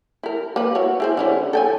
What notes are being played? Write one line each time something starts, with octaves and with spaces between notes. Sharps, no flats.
E4 A#4
A#3 B4
E4 F#4 C#5
E4 G#4 C5
D3 C#4 E4
A4 G5 G#5